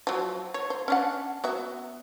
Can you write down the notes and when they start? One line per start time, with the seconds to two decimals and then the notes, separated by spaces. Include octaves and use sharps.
0.07 F3 F#3
0.54 C#5
0.70 C5
0.88 C#4 D4 F#5
1.44 B3 F#4 E5